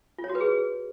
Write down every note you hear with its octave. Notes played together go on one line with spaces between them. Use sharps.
F4
C#5
F#4
B4
G#4